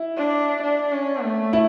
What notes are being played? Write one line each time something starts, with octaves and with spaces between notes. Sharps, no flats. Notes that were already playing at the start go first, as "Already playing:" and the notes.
Already playing: E4
D4
D4
C#4
A3
E4